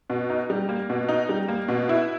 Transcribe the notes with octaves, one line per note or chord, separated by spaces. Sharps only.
B2
D#4
G3
A#3
B2
D#4
G3
A#3
B2
E4